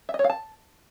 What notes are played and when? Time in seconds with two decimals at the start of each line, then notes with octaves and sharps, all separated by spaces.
0.09 E5
0.14 D#5
0.19 C#5
0.24 F5
0.30 A5